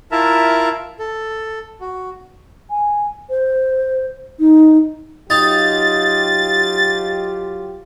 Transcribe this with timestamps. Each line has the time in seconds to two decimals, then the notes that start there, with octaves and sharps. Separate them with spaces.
0.12 E4 F4 A#4 E5 A5 A#5
0.99 A4
1.81 F#4
2.70 G#5
3.30 C5
4.39 D#4
5.30 F#3 D#4 F4 G4 A6